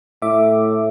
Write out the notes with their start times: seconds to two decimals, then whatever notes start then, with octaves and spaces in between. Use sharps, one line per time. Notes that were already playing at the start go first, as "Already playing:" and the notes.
0.22 A2 E5 D6